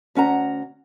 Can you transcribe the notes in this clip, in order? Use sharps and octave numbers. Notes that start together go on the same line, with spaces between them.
D2 C#4 F#5 A#5